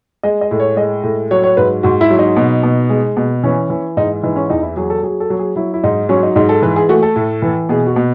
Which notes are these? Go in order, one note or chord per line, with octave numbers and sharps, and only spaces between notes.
G#3 D#5
D#5
A2
C#5
G#3 D#5
A2
F#3 C#5
C#5
G#2 B4
G#2 F#4
E4
F#3
D#4
B2
B2
G#3
B2
E3 C#4
E3
G#2 D#4
E3 D#4
C#4
E2 D#4
E4
F#3 G#4
A4
F#3 G#4
A4
F#3
G#4
F#3 E4
E4
G#2 D#4
F#3 C#4
D#4
G#2 D#4
A4
E3 B4
G#4
A3 F#4
A4
A2
E3
B2 G#4
F#4
B2